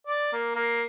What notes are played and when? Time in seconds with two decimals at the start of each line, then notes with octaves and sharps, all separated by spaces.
0.07 D5
0.33 A#3
0.55 A#3